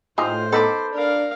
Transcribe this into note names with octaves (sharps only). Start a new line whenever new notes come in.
A2 D#4 F4 G4 G#4 C5
B3 D#4 A4 B5 D6
D4 A#4 D5 F5